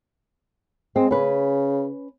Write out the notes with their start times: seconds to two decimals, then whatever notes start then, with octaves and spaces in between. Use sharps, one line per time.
0.96 G#3 C4
1.11 C#3 C#4 B4